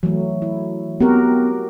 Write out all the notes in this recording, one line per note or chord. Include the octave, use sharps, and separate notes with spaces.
E3 F#3 A3
E4
B3 C4 F#4 G4 A#4